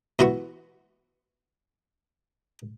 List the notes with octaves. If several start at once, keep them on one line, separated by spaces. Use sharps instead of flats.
B2 E3 F#4 B5 C#6